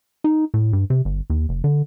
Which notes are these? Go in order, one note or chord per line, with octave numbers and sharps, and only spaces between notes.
D#4
A2
G2
C3
G1
D#2
F1
D3